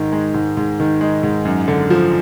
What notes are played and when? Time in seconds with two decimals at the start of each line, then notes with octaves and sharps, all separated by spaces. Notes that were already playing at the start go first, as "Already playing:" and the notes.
Already playing: G#2 D#3
0.12 G#3
0.34 G#2
0.57 G#2
0.80 D#3
1.01 G#3
1.23 G#2
1.45 F#2
1.68 D3
1.90 F3